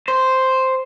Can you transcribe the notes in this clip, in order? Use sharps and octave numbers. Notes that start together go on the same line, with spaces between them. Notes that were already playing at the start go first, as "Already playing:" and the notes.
C5